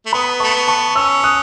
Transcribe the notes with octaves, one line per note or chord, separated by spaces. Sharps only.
A3
B3 B5 D#6
A3 A5 C#6
B3
A5 C#6
C#4 C#6 E6
D#6 F#6